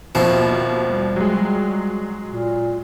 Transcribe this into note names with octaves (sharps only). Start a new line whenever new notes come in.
D#2 B2 F3 A#3 C4 E4
G3
F#3 G#3
A#2